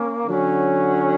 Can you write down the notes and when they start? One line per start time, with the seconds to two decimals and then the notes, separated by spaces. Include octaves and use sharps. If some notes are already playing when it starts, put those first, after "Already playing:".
Already playing: A#3 C#4
0.26 D3 F#3 C#4